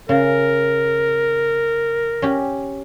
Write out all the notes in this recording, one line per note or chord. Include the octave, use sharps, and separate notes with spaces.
C#3 A#4
C#4 G4